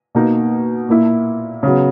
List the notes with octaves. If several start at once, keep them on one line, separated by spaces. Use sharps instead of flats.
B2 A#3 D#4
A#2 A#3 E4
C#3 F#3 B3